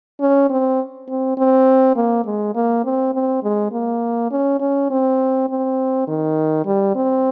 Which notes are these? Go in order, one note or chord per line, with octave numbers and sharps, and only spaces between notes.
C#4
C4
C4
C4
A#3
G#3
A#3
C4
C4
G#3
A#3
C#4
C#4
C4
C4
D#3
G3
C4